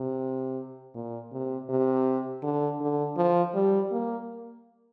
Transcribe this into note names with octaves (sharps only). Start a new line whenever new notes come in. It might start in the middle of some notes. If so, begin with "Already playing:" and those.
Already playing: C3
A#2
C3
C3
D3
D3
F3
G3
A#3